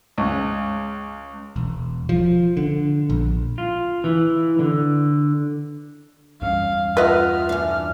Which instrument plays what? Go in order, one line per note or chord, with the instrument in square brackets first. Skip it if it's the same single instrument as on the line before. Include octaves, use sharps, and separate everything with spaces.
[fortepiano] C#2
[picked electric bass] E1
F3
D3
A#1
[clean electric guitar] F4
E3
D3
[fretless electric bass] E2 G2 C#4 [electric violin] F5
[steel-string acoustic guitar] F4 E5 F#5 [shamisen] B4 D#5 [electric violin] F6
[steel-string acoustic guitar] E3 D4